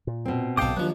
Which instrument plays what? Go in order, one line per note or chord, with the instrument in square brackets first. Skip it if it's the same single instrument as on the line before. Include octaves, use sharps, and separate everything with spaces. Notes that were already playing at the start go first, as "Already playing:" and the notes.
[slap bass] A#2
[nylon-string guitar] B2 C4
[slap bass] B1 G#2 [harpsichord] A4 D#5 [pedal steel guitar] F5 G5 D6
[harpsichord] D#2 F3 [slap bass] F#3 A#3 D4 [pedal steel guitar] B4